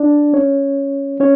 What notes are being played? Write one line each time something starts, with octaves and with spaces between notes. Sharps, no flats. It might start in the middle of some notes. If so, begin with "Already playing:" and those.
Already playing: D4 D5
C#4 C#5
C#4 C#5